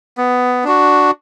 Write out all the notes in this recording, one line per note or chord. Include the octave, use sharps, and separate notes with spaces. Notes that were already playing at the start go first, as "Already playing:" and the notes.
B3
D4 F#4